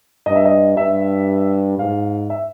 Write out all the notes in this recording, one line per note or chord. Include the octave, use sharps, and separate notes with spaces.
G2 D#5
E5
D#5
G2 E5
G#2 F5
E5